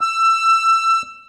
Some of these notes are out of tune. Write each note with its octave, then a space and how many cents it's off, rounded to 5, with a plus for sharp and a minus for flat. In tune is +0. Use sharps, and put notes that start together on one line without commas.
E6 +20